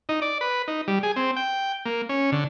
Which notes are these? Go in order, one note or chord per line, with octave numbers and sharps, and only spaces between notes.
D#4
D5
B4
D#4
G3
G#4
C4
G5
A#3
C#4
D3